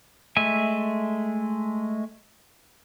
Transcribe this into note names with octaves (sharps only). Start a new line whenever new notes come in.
G#3 A3 E5 G#5